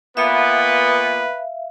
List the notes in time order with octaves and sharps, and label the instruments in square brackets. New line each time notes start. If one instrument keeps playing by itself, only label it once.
[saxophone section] A#2 B3 [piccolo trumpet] B4 [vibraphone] E5 F5